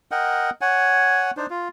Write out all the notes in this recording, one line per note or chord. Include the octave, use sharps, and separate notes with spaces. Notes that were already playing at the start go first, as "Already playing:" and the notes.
A#4 D#5 F#5 G5
C#5 F#5 G#5
D4 D#4 C5
F4